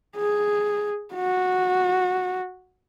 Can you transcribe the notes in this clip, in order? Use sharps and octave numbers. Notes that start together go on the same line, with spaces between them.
G#4
F#4